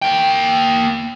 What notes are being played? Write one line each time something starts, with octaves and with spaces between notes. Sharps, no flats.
A#3 G5